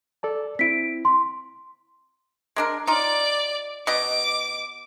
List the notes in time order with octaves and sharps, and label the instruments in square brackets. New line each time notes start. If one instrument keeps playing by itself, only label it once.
[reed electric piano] A4 D5 A5
[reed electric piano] C4 E4 [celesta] B6 D7
[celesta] C6
[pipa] G#3 D4 A#4
[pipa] D#4 F4 [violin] D5 D6
[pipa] B2 D#5 [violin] D6